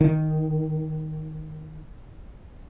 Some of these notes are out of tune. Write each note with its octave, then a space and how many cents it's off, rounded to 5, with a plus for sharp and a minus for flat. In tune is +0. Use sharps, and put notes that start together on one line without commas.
D#3 +0